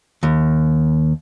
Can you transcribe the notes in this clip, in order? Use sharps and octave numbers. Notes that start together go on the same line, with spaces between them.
D#2